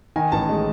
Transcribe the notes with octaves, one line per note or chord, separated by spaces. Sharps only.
D#3 G#5
A1 A5
G#3